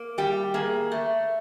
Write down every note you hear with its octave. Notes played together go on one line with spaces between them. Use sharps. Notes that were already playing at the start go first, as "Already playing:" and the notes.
Already playing: A#3
G3 G4
A#3 G#4
A3